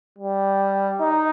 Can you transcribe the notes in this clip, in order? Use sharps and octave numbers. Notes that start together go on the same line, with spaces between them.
G3
D#4